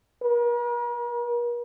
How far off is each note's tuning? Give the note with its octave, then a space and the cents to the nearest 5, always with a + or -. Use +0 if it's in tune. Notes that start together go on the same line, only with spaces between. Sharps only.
A#4 +45